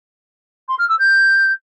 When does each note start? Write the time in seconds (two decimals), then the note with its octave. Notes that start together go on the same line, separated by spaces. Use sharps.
0.68 C6
0.79 F6
0.89 E6
0.99 G6